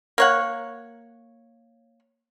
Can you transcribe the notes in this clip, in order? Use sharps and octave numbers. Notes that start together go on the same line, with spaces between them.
A#3 C#5 F#5